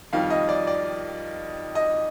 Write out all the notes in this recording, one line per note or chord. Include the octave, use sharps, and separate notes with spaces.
F2 D#3 G3 F5
D#5
D5
D5
D#5